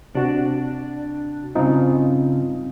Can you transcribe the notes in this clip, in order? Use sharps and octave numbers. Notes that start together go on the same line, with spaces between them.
C3 D4 F#4
G2 C#3 C4 D#4 F4